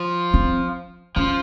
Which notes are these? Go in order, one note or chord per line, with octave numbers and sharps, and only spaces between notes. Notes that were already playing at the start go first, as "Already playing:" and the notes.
Already playing: F3
C4
F3 C#4